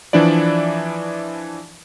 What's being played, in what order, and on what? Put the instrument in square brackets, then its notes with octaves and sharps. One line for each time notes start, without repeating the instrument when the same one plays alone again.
[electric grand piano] E3 F3 D4 E4 D5